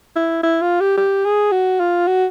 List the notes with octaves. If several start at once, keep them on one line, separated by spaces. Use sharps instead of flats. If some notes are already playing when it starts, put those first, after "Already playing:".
E4
E4
F4
G4
G4
G#4
F#4
F4
F#4